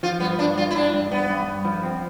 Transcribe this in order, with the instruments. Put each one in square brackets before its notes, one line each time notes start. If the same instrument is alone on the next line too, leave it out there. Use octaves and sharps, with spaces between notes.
[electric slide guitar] F3 [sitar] F4
[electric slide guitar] G2 [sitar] B3
[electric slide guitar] G2 [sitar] D4
[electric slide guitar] G2 [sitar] F4
[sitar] E4
[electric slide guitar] G2 [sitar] D4
[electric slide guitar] G2
[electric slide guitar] G2 [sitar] B3
[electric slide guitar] G2
G2
F3
C4